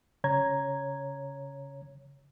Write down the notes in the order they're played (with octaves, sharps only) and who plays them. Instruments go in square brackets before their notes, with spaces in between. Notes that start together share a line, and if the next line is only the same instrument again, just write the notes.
[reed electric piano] C#3 C#5 A#5 G#6